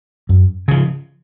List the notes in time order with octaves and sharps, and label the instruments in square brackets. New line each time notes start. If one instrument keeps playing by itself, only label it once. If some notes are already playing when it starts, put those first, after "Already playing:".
[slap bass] F#2
C#3 F3